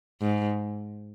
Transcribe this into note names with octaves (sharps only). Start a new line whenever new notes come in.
G#2